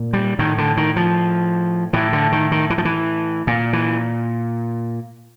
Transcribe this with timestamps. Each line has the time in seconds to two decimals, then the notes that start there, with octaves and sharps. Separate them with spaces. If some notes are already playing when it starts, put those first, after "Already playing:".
Already playing: A#2
0.13 G3
0.39 A2 D#3
0.58 D3
0.77 D#3
0.96 F3
1.93 A2 E3
2.13 D3
2.32 D#3
2.52 D#3
2.70 E3
2.78 F3
2.85 E3
3.47 A#2
3.73 E3